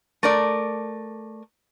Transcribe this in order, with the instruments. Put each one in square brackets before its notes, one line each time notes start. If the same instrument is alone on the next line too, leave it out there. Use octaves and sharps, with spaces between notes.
[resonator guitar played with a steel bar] A3 A#4 D5